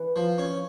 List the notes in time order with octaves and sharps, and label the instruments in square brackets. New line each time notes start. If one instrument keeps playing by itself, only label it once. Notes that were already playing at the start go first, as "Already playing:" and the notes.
Already playing: [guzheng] E3
[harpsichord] F3
C#4